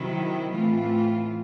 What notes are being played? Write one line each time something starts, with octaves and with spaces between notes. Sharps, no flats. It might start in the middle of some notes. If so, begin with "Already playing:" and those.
Already playing: C3 D#3 F#3 E4
A2 E3 A3 C4 F4